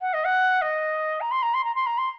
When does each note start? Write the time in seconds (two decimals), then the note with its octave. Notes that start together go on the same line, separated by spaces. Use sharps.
0.01 F#5
0.13 D#5
0.24 F#5
0.61 D#5
1.21 A#5
1.31 C6
1.42 A#5
1.54 C6
1.64 A#5
1.75 C6
1.86 A#5
1.98 C6